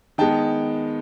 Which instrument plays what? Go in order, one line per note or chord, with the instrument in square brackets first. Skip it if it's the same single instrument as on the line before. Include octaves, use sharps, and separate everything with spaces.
[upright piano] D#3 G#3 B3 G5 A5